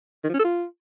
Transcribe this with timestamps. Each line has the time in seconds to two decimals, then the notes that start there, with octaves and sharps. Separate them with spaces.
0.24 D#3
0.29 F3
0.34 C#4
0.39 A4
0.45 F4